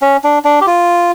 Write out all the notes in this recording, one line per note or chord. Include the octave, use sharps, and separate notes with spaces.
C#4
D4
D4
G4
F4